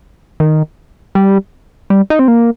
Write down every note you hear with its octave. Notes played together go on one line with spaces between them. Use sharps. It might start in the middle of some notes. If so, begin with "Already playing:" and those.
D#3
G3
G3
D#4
C4
A#3